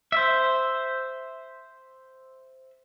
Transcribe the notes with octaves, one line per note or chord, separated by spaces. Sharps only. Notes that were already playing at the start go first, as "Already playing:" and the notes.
C5 E5